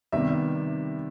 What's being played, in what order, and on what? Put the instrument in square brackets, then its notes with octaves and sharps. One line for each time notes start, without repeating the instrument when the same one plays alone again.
[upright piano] C3 D#3 G3 B3 E5